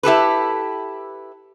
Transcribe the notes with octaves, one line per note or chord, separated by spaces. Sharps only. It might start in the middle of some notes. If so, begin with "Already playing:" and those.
E4 G4 A4 B4